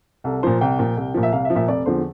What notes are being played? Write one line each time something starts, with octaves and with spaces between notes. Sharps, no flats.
C2 A4
A#2 F3 C5
C2 G5
A#2 F3
C2
A#2 F3
E5
C2 F5
E5
F3
A#2 E5
F1 D5
E2 D3 F3 C5